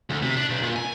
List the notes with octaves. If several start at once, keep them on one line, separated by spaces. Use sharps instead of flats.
D2
C3
D4
B1
A#2
G#5